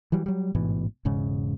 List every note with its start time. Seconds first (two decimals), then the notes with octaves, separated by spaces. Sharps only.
0.12 E3 F#3 G3
0.26 F#3 G3
0.55 A1 G#2 B2 E3
1.05 E1 G#2 C#3